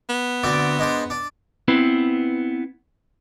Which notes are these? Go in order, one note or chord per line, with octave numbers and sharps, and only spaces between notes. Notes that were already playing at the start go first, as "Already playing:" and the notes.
B3
D2 C4 D5
G#3 D4 C5
D4
B3 C4 E4 B4